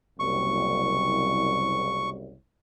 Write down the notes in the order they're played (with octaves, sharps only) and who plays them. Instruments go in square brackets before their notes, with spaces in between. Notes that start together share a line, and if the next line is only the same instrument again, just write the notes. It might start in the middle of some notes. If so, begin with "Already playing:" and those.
[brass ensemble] F#1 C2 [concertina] C#6